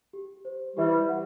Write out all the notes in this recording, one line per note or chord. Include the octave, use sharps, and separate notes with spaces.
G4
C5
E3 G3 G4
F#5